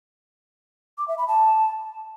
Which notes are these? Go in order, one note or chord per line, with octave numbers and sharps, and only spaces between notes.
D6
E5
B5
A5